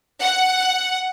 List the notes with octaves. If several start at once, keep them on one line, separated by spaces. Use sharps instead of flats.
F#5